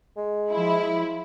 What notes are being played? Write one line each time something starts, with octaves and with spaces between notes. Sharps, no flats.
G#3
F3 E4